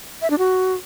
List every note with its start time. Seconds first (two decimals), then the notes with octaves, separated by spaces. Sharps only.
0.22 E5
0.30 D4
0.39 F#4